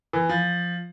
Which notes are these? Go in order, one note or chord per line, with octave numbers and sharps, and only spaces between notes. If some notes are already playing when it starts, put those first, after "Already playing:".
E3
F3